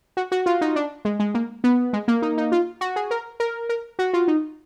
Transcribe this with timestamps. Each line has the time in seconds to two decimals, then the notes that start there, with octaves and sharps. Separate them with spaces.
0.17 F#4
0.32 F#4
0.46 F4
0.61 D#4
0.76 D4
1.05 G#3
1.19 G#3
1.35 A#3
1.64 B3
1.93 G#3
2.08 A#3
2.22 D#4
2.38 D#4
2.52 F4
2.81 F#4
2.96 G#4
3.11 A#4
3.40 A#4
3.69 A#4
3.99 F#4
4.13 F4
4.28 D#4